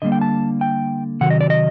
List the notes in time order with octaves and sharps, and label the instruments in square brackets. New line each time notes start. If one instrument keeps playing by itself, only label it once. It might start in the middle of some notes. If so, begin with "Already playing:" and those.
[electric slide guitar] D3 G3 A#3 D#5
G5
A5
G5
C3 D#3 F#3 F#5
D#5
D5
D#5